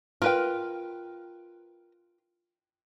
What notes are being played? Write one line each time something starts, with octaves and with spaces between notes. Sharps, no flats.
F4 A#4 B4 G5